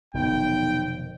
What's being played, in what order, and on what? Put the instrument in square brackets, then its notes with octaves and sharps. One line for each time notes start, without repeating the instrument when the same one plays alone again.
[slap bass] F1 B2 D#3 [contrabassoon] B1 [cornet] G5